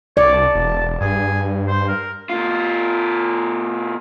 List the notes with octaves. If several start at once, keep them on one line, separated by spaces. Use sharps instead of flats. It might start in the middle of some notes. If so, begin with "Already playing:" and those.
C2 C#5 D5
A5
E1
G2 G#4
C5
A#4
B2 F4